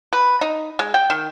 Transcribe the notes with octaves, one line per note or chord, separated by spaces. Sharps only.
B4
D#4
G#3
G5
D#3